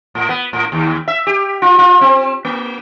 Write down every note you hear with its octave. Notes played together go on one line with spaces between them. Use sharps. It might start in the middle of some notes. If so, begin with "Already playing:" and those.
A2
B3
A2
D#2
E5
G4
F4
F4
C4
A#3